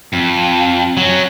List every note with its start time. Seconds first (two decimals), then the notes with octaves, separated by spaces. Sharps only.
0.13 F2
0.97 F#3 C#4